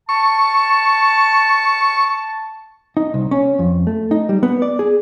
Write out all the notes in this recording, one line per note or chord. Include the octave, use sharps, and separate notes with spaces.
A5 C#6
D#4
C2
C#4
F2
A3
D#4
G3
B3
D5
G#4